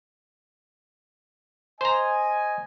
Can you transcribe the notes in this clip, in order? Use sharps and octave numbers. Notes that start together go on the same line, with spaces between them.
C5 D#5 G#5 A#5